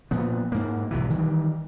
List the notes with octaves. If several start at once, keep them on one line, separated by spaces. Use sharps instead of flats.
A#2 F3 B3
G#2 A#3
B1 C3 E3
D#3 E3 G3